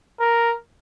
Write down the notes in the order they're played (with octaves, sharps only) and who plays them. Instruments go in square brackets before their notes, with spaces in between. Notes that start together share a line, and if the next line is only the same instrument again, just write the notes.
[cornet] A#4